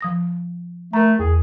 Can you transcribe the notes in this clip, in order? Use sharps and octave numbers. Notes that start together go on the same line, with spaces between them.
F3 D#6 A#6
A3 A#4 A#5
E2 G#4